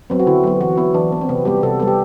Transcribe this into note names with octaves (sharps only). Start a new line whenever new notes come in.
F#3 B3 C4
F#4
D3 E4
F#3 B3
E3 F#4
B3 E4
E3 D4
B3
C4
C3 B3
G3 B3 G4
C3 A4
G3 B3 A4
G4